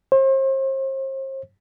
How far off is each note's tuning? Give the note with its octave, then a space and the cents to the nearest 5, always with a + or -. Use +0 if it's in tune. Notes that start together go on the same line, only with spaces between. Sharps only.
C5 +40